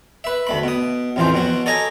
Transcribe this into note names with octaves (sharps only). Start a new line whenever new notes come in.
B4 E5
D2 A3 B5
B2 D#6
A1 F2 C#3 E3 F3 C5
B2 F#3 F#4
A4 C#5 D#5 G#5 A#5